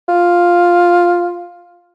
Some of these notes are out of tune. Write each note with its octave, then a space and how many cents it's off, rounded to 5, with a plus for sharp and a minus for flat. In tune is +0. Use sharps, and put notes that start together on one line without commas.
F4 +5